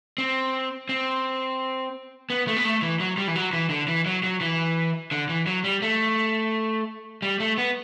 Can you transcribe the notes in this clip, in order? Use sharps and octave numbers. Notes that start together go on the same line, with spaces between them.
C4
C4
B3
A3
B3
A3
E3
F#3
G3
E3
F#3
E3
D3
E3
F#3
F#3
E3
D3
E3
F#3
G3
A3
G3
A3
B3